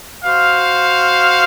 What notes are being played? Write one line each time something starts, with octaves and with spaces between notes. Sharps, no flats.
F#4 C5 F5